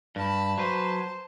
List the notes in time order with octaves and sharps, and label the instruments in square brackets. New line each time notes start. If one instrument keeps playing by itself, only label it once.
[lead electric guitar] G2 [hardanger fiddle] A5 B5
[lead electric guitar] F#3 B4 [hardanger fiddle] C5 A5